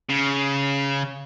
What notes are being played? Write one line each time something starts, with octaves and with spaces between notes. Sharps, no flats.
C#3